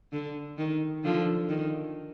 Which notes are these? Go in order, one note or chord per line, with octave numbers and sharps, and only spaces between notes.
D3
D#3
D3 F3
D#3